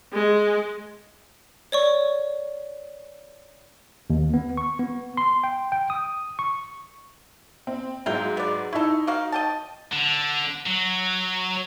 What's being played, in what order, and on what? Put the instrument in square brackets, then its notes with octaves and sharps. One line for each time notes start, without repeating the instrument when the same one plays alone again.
[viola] G#3
[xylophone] C#5 D5 C#6
[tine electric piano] D#2
B3
C#6
B3
C6
G5
G5
D#6
C#6
[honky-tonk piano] C4
[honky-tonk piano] G#2 F#3 [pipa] F5 G5
[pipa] B3 D5
[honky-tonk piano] D#4 C#6 [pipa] E4 A4
[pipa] A#3 F#4 F5
D#5 G5 A5
[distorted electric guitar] D3
F#3